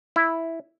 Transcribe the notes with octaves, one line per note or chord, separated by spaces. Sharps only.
E4